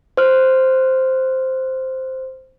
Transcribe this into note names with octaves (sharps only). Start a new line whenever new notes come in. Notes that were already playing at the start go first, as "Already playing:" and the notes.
C5 F6